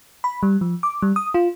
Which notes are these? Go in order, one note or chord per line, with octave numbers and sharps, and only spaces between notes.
B5
G3
F3
D6
G3
D#6
F4